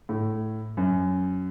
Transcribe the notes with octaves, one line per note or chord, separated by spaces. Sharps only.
A2
F#2